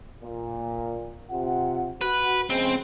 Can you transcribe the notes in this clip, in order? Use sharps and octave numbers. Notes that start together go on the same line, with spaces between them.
A#2
C3 F4 F#5
F#4 B4
F2 C#3 G#3 C4